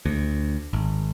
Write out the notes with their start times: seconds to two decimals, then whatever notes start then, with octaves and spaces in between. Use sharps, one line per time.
0.06 D2
0.73 G#1